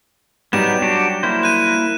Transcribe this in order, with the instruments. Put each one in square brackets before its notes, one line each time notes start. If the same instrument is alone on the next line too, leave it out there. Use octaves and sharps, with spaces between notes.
[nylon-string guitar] F#3 G3 [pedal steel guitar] B3 D#4 G4 [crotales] E7
[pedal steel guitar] D4 F#4 G4
A#3 E4 C5
[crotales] F#6 D#7